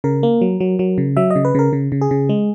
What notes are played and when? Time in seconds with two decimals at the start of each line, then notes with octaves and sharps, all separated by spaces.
0.04 C#3 A#4
0.23 A#3
0.41 F#3
0.60 F#3
0.79 F#3
0.98 C#3
1.17 F#3 E5
1.31 D#5
1.36 C#3
1.45 B4
1.55 C#3 A#4
1.73 C#3
1.92 C#3
2.01 G#4
2.11 C#3
2.29 G#3